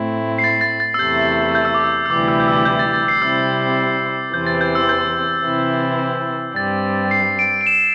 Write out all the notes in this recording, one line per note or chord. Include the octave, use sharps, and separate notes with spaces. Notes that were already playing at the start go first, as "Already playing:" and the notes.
Already playing: A2 A3 C4 E4
C7
A6
A6
A6
E6
E2 C3 A3 E4 G6
G6
E6
D6
E6
E6
D2 C3 E3 G3 E4 D6
E6
G6
E6
G6
A6
A6
C7
C3 G3 C4 E4 E6
E2 C3 E3 C4 G6
A6
G6
E6
G6
C3 E3 C4 E4
G2 G3 C4 A6
C7
D7
D7
E7